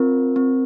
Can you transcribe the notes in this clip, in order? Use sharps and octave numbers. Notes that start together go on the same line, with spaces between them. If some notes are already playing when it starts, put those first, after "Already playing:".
Already playing: C4 F4 A#4
C4